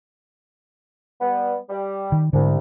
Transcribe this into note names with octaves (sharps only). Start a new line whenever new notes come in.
G3 B3
G3
D#3
C2 G#2 D3